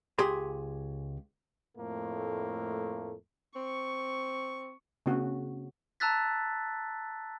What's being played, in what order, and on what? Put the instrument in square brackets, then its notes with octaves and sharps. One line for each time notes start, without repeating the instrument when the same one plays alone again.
[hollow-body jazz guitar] C#2 G4 G#4 C6
[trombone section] F2 A2 A3 A#3
[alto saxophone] C4 [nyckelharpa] C#6
[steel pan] C#3 A#3 C4 F#4
[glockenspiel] A5 A#5 E6 F#6 A6 B6